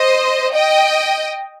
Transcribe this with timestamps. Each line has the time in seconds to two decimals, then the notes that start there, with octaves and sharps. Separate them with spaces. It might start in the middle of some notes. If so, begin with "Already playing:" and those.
Already playing: C5 D#5
0.54 D#5 G5